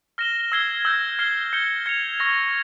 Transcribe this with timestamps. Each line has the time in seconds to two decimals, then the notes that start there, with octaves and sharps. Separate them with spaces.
0.18 F6 A#6 E7 G7
0.52 E6 G#6 C7 G7
0.85 E6 G6 A#6
1.19 F6 C7 G7
1.53 G6 C#7 G7
1.86 G#6 C#7 F7
2.20 C#6 E6 A#6